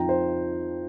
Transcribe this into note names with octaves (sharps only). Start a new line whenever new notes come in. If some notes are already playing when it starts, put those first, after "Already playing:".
Already playing: F2 F3 D#4 G5 A#5
C5